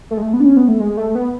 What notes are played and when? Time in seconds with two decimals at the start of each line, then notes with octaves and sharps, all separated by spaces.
0.11 A3
0.18 G#3
0.22 A3
0.34 B3
0.40 D4
0.45 C#4
0.57 B3
0.68 A3
0.80 G#3
0.97 A3
1.15 B3